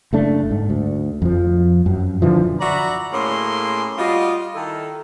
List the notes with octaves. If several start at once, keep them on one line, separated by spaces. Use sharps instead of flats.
F#1 A3 D4
G#2
D2
F2 F3
F#2
E1 D3 E3 F3
F#4 D5 E5 A#5 B5
A2 A#3 C#4 G#4 C6
G3 F4 F#4 D#5
D#3 E4 A4